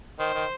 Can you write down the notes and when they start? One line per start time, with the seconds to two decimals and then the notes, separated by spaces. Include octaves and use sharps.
0.19 D#3 C5
0.34 D#3